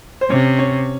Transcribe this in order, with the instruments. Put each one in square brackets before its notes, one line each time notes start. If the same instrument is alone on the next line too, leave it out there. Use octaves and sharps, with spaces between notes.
[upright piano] C5
[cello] C3 [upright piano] C#4 C#5
[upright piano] C#4 C#5